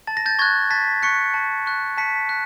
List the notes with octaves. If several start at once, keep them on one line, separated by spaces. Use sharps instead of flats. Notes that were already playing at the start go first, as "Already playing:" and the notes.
A5 A6
A#6
G6 A6
C#6 F#6 G#6 A#6
A5 A6 B6
C#6 F#6 B6 C#7
A5
C#6 F#6
A5 B6 C#7
F#6